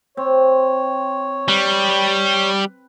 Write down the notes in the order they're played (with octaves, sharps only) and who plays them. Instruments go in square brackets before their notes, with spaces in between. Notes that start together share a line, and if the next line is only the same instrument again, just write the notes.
[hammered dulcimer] C4 [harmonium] C#5
[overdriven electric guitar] G3 [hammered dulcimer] B4